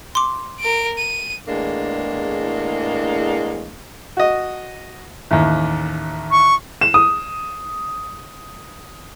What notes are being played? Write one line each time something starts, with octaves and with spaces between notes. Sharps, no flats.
C6 D6
A#4 D7
D#7
E2 A2 G#3 A#3 D4
F#4 D#5
A1 D#2
C#6
E7
D#6